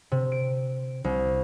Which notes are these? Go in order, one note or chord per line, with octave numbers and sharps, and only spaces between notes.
C3
D7
C2